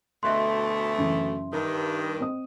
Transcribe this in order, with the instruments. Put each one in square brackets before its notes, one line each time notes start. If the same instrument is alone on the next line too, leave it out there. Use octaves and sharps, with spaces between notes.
[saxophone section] D2 B2 A3 [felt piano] D#5 F#6 [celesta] E5 C6
[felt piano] F#2 C#3 E3
[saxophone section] G2 D#3 [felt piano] A#4
[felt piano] C4 D#5 D#6